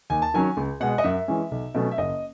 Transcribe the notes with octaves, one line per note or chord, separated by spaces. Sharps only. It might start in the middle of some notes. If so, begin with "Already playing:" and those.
D#2 G#5
A5
D#3 F#3 C#4 G#5
C#2
B2 G#3 F#5
D#5
F#2 E5
E3 G#3 C#4
B1
B2 F#3 A3 C#4
E5
F#1 D#5